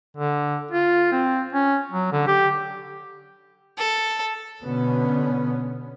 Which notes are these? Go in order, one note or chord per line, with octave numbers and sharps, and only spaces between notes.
D3
F4
C4
C#4
F#3
D3
G4
A4
B2 D3 B3 C#4